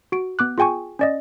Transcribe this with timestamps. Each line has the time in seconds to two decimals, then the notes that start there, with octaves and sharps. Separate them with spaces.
0.12 F#4 D7
0.39 B3 D6 F#6
0.58 F4 G#4 G5 G#5 C#6
0.99 C#4 D5 D#5